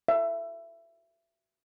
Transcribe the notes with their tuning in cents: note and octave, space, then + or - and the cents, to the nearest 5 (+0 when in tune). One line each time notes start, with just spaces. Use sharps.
E5 +20